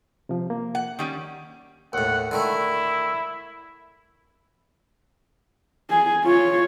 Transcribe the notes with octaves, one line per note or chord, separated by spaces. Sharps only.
C3 F3
A#3
F#5
D#3 G3 C#4
D#2 A2 F#5
D3 D#3 A3 E4
G#4 G#5
F4 C#5